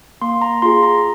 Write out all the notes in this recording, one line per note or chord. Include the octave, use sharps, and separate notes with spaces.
A#3 C6
A#5
F4 G#4 C6
A#5